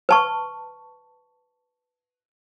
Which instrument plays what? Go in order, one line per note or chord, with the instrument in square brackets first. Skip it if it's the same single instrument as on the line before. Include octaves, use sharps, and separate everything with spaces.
[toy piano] B4 A5 C#6